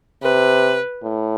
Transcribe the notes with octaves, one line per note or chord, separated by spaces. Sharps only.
C3 B4
A2